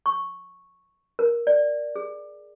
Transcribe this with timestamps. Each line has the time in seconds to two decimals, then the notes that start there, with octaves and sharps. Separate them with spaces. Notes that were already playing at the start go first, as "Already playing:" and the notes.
0.06 C#6
1.19 A#4
1.47 D5
1.96 G#4